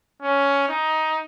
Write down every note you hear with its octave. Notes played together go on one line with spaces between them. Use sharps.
C#4
D#4